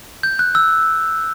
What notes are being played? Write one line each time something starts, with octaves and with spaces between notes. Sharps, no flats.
G6
F#6
E6